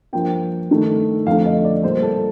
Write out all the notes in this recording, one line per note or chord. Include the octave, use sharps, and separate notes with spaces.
G2 F3 A#3 G5
G2 D#3 A3
F2 D3 A3 F5
D#5
D5
A#2 G3 A#3 C5
A4